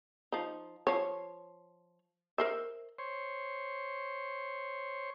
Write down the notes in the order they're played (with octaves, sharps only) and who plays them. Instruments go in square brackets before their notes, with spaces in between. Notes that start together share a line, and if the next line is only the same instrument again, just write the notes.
[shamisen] F3 D#4
F3 C#5
A#4 C5 E5
[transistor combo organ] C5 C#5